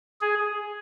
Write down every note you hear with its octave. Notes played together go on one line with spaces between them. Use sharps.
G#4